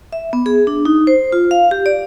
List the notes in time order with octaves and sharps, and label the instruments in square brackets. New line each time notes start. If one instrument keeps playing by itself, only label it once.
[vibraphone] E5
B3
G#4
D4
D#4
C5
F4
F5
G4
D5